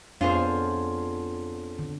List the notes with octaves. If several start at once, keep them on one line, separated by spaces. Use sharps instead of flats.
F2 B3 D4 F4 G#4 C5 C#5
D3